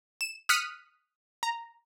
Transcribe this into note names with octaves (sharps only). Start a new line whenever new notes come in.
E7
D#6 F6 F#6 B6 C#7 D#7
A#5